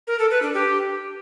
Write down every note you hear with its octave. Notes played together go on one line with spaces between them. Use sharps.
A#4
A4
B4
D4
G4